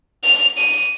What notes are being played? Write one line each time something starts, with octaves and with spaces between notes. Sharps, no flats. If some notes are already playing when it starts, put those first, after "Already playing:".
F7
D#7